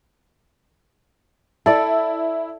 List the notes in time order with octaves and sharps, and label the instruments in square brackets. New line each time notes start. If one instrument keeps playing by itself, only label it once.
[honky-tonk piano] E4 [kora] A4 D5